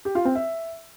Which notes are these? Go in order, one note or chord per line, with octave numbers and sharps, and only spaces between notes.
G4
F4
C4
E5